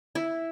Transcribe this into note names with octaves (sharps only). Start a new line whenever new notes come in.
E4